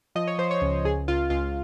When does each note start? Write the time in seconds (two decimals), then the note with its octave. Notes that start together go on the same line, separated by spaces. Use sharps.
0.15 F3 D#5
0.27 C#5
0.38 F3 C5
0.51 C#5
0.62 C#2
0.84 C#2 G#4
1.08 C#2 F4
1.30 C#2 F4